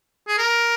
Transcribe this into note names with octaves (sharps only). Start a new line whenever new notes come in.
G#4
A#4